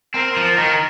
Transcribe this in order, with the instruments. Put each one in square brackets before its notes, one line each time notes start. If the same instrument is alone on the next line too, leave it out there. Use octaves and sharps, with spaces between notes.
[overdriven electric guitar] C4 [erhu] A#4
[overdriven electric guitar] F3
D#3